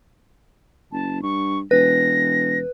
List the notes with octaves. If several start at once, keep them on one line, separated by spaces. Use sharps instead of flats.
F#1 A5
G2 C#6
E1 B4 A#6